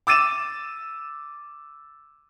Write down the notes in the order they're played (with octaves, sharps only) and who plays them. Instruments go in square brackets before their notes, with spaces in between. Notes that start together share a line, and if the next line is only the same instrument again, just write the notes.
[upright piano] D6 E6 A6 D#7 E7